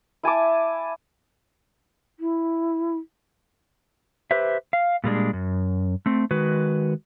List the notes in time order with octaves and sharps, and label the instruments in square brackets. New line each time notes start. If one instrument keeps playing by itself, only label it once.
[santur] E4 G#5 A5 D6
[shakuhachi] E4
[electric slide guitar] G4 B4 C5 E5
F5
A#2 G3 G#3 D4
F#2
A3 C4
D#3 G#3 F#4 B4